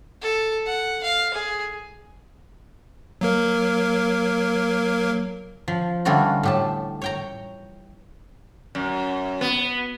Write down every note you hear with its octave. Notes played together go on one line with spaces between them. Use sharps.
A4
F#5
F5
G#4
F#3 A#3 A#4
F3
D3 E3 G3 A3 F4 F#4
A2 G4 A5
C#5 G5 A#5
F#2
B3